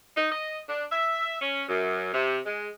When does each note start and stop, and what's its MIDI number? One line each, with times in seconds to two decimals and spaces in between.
0.17 0.28 63
0.32 0.59 75
0.69 0.85 62
0.92 1.41 76
1.41 1.63 61
1.68 2.11 42
2.13 2.38 48
2.46 2.69 56